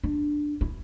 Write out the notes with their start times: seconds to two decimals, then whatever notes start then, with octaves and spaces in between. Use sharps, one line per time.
0.03 D4
0.61 E4